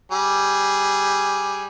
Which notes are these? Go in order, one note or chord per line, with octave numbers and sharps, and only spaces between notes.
G3 G#4